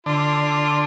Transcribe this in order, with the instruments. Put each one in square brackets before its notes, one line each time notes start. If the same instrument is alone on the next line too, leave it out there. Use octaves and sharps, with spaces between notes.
[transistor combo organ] D3 [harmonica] F4